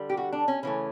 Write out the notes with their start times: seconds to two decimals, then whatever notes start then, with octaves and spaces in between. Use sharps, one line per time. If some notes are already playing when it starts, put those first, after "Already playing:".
Already playing: D3 G3
0.10 G4
0.17 F#4
0.33 D4
0.48 C#4
0.63 C#3 E3 A3 C#4